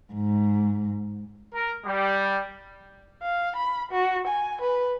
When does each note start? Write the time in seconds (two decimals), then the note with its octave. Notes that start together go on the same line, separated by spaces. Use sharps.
0.13 G#2
1.53 A#4
1.85 G3
3.22 F5
3.56 B5
3.92 F#4
4.27 G#5
4.62 B4